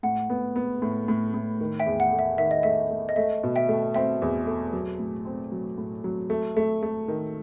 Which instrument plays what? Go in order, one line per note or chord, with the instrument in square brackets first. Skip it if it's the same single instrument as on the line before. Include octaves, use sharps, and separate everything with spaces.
[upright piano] A2 [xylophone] F#5
[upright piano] B3
B3
A2
A2
A2
D#3
[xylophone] E5 G5
[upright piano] E2
[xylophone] F#5
[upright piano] A3
[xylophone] E5
[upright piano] D#3 [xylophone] E5
[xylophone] D#5
[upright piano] A3 [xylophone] E5
[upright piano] A3
[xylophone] D#5
[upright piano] A3 [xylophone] E5
[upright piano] B2
[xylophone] E5 G5
[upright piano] A3
[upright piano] C4 [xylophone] E5 G5
[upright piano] E2
A3
F#3
A2
C4
F#3
A2
F#3
A3
A3
A3
D#3